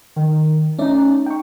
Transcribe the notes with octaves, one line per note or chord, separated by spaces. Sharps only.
D#3
A3 C#4 D#4 D5
G5 C#6